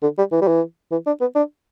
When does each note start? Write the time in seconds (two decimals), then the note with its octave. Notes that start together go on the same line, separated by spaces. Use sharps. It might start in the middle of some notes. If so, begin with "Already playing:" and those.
0.03 D3
0.18 G3
0.32 E3
0.42 G3
0.48 E3
0.92 E3
1.07 D4
1.21 B3
1.36 D4